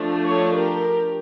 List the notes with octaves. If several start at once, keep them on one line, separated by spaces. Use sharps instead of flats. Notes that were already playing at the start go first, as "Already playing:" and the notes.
Already playing: F3 A3 D4
A4 C#5
G4 A#4